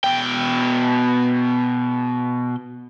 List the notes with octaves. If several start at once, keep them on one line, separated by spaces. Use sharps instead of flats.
B2 G5